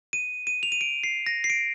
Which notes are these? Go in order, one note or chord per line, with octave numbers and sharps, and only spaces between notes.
D#7
D#7
F7
D#7
D7
C7
A#6
C7
D7